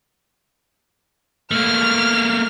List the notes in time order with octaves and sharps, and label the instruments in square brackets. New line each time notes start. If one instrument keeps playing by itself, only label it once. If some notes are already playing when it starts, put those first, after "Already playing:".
[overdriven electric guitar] A3 A#3 [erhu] F6